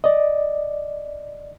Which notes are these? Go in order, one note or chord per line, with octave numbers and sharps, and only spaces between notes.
D5 D#5